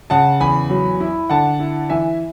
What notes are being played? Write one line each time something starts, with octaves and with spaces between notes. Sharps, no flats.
C#3 F#5 A5
E2 G#5 B5
F#3
E4
D3 F#5 A5
E4
E3 E5 G#5